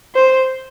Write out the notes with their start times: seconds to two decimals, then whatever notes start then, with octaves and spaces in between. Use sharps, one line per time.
0.15 C5